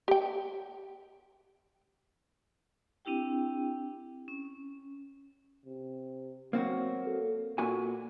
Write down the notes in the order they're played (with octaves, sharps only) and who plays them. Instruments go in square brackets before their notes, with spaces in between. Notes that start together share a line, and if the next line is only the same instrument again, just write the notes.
[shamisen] G4 G5
[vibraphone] C4 D4 E4 G4 G5
C#4
[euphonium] C3
[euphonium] F#3 [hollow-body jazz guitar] A#3 C4 F#4
[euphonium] A4
[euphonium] A#2 [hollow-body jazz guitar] A#3 F#4 G#5